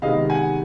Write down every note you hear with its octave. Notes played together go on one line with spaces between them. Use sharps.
C3 D#3 G#3 B3 D#5 F5
F#5 G#5